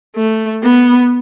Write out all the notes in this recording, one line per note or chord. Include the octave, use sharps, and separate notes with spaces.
A3
B3